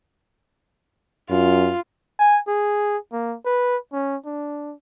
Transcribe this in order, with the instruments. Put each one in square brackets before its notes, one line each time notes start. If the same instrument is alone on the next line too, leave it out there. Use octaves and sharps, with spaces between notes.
[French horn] F#2 [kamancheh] F4
[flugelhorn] G#5
G#4
A#3
B4
C#4
D4